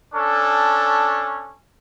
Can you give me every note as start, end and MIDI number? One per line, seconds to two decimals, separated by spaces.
0.13 1.52 61
0.13 1.52 62
0.13 1.52 69